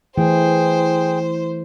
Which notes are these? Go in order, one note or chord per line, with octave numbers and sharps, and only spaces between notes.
E3 A3 E4 G#4 C5 G5